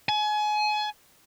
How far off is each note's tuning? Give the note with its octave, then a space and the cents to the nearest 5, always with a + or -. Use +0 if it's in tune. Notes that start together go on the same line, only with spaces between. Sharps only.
G#5 +30